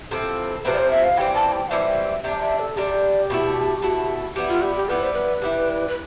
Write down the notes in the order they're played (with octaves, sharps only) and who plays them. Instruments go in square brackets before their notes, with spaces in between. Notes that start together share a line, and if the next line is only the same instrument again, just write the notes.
[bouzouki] C3 F3 C4 E4 [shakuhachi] A4
[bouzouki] C3 F3 C4 E4 [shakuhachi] B4
[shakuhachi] D5
C5
E5
F5
[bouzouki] E3 G3 C4 [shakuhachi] G5
[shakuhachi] A5
G5
[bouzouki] E3 G3 C4 [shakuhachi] E5
[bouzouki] C3 G3 D4 [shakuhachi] E5
[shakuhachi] D5
E5
A4
[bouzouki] C3 G3 D4 [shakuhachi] G4
[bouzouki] B2 A3 E4
B2 A3 E4
G3 B3 E4
[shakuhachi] F4
G4
G4
[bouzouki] G3 B3 E4 [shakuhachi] B4
[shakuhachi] C5
B4
[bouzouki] G3 B3 E4 G4
[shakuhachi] B4